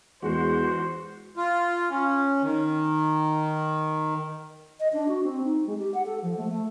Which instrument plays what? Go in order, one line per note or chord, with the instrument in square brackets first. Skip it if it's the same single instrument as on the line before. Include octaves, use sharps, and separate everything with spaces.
[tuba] E2 [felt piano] G#3 [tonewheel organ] F#4 [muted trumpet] C5
[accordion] F4
C#4
D#3
[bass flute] D#5
D4
F#4
C4
D#4
G#3
G4
F#5
A4
F3
A3
A3